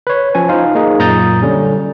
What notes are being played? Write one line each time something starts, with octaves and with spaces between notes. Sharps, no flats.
B4 C#5
F3 C#4 G#5
D#4 F4 C5 F5
A#3 D#4 G#4
F#2 A#2 A#5 D#6 G6 A6
D3 G3 C#4